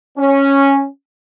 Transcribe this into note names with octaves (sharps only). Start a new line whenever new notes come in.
C#4